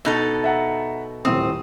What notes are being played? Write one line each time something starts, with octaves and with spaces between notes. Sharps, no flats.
B2 D#4 A4
E5 F#5 A#5
D#1 A2 C4 D#6